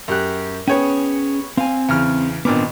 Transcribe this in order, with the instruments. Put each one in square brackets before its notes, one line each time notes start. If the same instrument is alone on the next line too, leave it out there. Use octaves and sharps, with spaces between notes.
[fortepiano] F#2 G4 F#6
[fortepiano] B3 C#5 G5 [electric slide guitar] C#4 G#4
[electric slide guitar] C4 G#5 [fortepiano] F5
[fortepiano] E2 C#3 F6
[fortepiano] G#1 A#2 D6 [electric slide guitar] B3 C4 D4